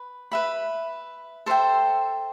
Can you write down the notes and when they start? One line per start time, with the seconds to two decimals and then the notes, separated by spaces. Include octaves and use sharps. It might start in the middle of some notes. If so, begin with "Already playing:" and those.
Already playing: B4
0.32 B4 E5 B5
1.46 A4 C5 E5 G5